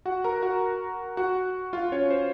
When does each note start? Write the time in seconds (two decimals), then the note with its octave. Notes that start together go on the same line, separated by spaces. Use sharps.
0.05 F#4 F#5
0.24 A#4 A#5
0.42 F#4 F#5
1.17 F#4 F#5
1.73 F4 F5
1.92 C#4 C#5
2.10 C5